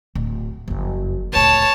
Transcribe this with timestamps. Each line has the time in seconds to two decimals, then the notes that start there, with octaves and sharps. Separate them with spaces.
0.15 D1
0.68 F#1 F2
1.33 D1 C#2 C#5 A5